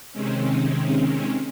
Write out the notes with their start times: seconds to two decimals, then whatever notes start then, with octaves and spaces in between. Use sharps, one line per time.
0.12 C3 D#3 G#3 C4 C#4